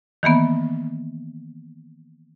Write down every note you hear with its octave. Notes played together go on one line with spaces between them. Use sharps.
D#3 E3 A#3 B3